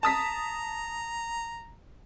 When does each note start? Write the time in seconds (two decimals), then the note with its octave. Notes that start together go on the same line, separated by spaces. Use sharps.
0.03 A5 A#5 D#6 B6